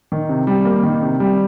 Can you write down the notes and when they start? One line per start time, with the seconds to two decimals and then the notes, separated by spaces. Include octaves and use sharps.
0.12 D#3
0.29 C3
0.47 G3
0.65 A#3
0.83 D#3
1.02 C3
1.20 G3